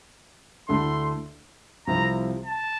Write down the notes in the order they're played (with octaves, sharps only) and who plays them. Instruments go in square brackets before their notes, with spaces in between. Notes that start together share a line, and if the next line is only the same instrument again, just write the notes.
[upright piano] D2 D3 A3 E4 [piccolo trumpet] C6
[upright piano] C2 C3 F3 C4 E4 [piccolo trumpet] A#5
[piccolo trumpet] A5